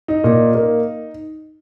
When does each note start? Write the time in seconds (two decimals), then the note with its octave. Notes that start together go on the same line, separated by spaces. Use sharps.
0.08 D#4
0.24 A#2 D#4
0.54 A#3